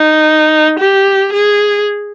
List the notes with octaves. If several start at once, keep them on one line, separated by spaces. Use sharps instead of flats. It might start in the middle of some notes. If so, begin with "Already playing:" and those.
Already playing: D#4
G4
G#4